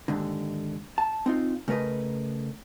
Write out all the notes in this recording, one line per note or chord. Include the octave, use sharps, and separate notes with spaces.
D#2 G#2 D3
A5
C4 D#4 F4
C#3 A3 A#4 B4 D#5